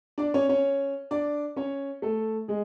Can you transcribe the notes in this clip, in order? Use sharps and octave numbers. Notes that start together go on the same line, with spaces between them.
D4 D5
C#4 C#5
C#4 C#5
D4 D5
C#4 C#5
A3 A4
G#3 G#4